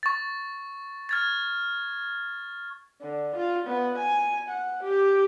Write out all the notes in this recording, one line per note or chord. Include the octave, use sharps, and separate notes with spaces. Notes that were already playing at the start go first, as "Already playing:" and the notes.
C#6 A6
F6 G#6 A6
D3
F4
B3
G#5
F#5
G4